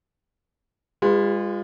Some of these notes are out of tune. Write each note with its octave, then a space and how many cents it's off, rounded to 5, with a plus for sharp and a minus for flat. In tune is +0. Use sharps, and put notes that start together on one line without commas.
G#3 -40 F4 +0 B4 +10